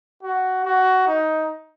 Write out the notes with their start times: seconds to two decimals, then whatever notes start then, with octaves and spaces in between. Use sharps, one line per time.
0.23 F#4
0.65 F#4
1.07 D#4